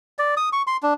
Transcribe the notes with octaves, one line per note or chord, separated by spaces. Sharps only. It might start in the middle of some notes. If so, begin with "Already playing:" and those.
D5
D#6
C#6
C6
D4